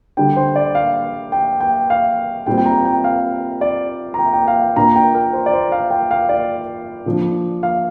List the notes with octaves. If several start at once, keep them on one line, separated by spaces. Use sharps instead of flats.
D3 G3 D4 G5
C5
D5
F5
G5
G5
F5
A#2 G3 C4 G5
G5
A#5
G5
F5
D5
A#5
G5
G5
F5
G5
A#2 A#3 D4 A#5
G5
A#4
C5
D5
C5
F5
G5
F5
D5
A#2 F3 D4
F5